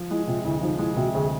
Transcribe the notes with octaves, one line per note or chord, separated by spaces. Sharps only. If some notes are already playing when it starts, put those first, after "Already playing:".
Already playing: F3
G#3 E4
C3 F4
D2 E4
F3 D#4
G#3 E4
C3 F#4
D2 G#4